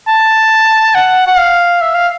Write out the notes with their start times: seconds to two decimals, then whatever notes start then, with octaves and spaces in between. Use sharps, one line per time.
0.07 A5
0.95 F#5
1.27 F#5
1.38 F5
1.81 E5
1.95 F5